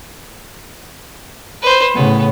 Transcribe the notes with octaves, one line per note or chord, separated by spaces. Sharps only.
B4 C5
A2 C#3 B3